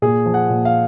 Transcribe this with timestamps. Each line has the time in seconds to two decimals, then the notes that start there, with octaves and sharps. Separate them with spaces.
0.02 A#2 G#4
0.26 F3
0.34 F#5
0.49 A#2
0.65 F5